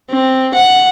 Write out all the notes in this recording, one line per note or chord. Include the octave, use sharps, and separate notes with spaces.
C4
F#5